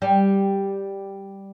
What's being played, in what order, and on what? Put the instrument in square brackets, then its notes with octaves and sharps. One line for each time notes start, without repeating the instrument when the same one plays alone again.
[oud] G3